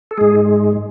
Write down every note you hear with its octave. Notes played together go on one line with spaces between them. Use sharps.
A4
G#2 G#3 G#4